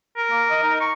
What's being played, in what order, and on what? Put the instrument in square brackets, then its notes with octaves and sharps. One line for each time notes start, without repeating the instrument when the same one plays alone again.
[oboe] A#4
[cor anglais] A#3
D#5
D#4
[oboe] C#6